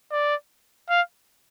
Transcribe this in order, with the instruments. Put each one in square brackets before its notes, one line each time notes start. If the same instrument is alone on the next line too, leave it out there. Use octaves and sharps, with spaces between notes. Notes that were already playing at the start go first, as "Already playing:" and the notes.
[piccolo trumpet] D5
F5